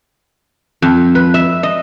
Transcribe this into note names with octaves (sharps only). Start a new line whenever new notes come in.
F2
B4
E5
D#5